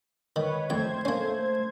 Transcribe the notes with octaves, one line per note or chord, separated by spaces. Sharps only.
D#3 B4 C#5
F2 A3 C5 G5 G#6
A#3 C#4